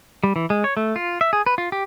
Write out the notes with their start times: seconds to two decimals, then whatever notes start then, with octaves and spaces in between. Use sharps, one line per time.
0.24 G3
0.36 E3
0.50 G#3
0.64 C#5
0.77 A3
0.96 F4
1.21 E5
1.33 G#4
1.46 B4
1.58 F4
1.72 G4